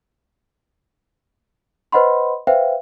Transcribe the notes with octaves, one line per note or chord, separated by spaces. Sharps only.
B4 C5 D#5 F#5 B5 C6
B4 C5 E5 F5 G5